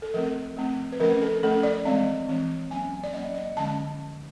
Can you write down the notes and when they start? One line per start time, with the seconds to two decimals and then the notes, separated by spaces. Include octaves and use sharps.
0.02 A4
0.14 F3 A3 C4 A#4
0.57 F3 A3 C4
0.92 B4
1.00 F3 A3 C#4 A#4
1.22 A4
1.43 F3 A3 C#4 A4
1.63 D5
1.85 E3 G#3 C4 D#5
2.28 E3 G#3 C4
2.71 F#3 A#3 C#4 G#5
2.92 G#5
3.04 D5
3.13 F#3 A#3 C#4 D#5
3.35 D#5
3.57 D3 F3 G#3 C#4 A5